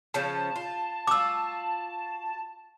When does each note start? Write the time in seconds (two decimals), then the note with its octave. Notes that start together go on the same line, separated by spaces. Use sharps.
0.14 C#3 F3 C#4 A5
0.56 F4
1.07 F4 F#4 D6 E6